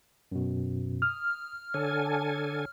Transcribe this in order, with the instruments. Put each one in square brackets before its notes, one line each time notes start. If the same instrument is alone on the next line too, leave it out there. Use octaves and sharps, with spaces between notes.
[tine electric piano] F#2 B2
[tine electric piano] D#6 [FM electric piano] F6
[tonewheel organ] D3 A4 G#5 [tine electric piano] C#5